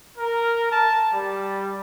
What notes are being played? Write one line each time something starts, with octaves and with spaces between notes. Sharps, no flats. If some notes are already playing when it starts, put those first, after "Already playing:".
A#4
A5
G3